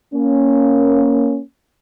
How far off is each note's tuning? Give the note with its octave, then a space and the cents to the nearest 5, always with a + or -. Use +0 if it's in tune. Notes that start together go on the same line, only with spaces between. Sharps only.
A#3 +0 C#4 +0